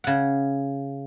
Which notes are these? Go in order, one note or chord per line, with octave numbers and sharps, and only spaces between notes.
C#3 F#5